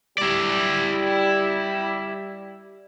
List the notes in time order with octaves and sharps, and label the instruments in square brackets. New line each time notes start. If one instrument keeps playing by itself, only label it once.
[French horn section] G3 [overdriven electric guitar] E4 D5